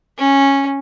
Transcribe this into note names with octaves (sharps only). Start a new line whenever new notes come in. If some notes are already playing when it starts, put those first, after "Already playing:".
C#4